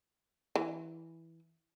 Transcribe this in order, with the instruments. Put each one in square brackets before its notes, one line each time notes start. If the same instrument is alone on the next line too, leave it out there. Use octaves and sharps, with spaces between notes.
[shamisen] E3